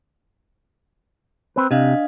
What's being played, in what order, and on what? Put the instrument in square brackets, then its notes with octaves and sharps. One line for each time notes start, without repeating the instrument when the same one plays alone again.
[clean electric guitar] C4 B4
[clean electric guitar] C3 [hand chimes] D4 D#5 F5